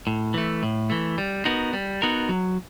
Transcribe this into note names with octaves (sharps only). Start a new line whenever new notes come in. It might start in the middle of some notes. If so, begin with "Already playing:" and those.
A2
E3 A3
A2
E3 A3
G3
B3 D#4 F#4 A#4
G3
B3 D#4 F#4 A#4
F#3